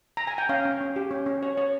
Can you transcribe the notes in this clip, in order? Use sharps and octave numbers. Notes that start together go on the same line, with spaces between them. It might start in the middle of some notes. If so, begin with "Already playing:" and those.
A#5
G#5
G5
C#4 F5
C#4
C#4
G4
C#4
C#4
C#5
C#5